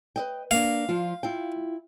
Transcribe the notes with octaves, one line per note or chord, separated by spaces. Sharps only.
B4 D#5 G5
A#3 D4 F5
F3 F4
E4 F4 G5